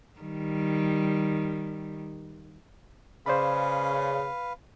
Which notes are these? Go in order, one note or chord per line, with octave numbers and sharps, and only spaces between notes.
D#3 G3
C#3 B4 C5 D5 F5 B5